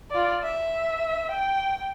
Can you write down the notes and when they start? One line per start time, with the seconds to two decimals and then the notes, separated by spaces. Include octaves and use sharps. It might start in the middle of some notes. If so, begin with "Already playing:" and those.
0.11 F4 D5
0.43 E5
1.31 G5